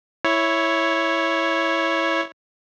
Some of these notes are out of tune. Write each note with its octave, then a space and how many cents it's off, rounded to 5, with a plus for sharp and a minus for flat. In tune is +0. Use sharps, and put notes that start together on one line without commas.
E4 +0 C#5 +0